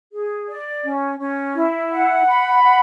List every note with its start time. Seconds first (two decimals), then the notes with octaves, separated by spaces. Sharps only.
0.13 G#4
0.49 D5
0.84 C#4
1.19 C#4
1.55 E4
1.92 F#5
2.26 B5
2.63 F#5